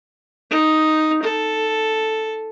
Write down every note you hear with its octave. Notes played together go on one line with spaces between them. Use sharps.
D#4
A4